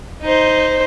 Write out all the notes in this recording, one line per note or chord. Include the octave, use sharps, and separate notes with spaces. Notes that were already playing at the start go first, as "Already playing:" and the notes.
D#4 C5